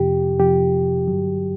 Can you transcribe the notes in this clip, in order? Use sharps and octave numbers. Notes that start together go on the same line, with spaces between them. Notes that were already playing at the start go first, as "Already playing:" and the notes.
Already playing: F2 C3 F3 G4
F2 C3 F3 G4
G2 D3 F#3